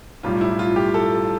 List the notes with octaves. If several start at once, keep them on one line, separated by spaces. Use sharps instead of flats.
B1 A2 G3 F4
E4
F4
G4
A4